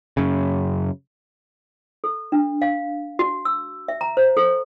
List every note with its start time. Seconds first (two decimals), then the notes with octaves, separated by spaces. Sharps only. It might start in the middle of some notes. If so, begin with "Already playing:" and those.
0.17 F#2 C#3
2.04 A4
2.32 D4
2.62 F5
3.19 F#4
3.45 E6
3.88 E5
4.01 A#5
4.17 C5
4.37 A4